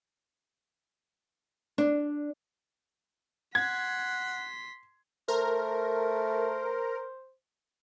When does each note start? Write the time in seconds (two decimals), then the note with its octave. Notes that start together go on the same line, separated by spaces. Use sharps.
1.78 D4
3.55 F#5 C6 G#6 B6
5.28 A3 A#4 C5